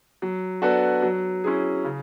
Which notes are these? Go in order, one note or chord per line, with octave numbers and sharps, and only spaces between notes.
F#3
B3 D4 F#4 A4
F#3
C#4 E4 G#4
C#3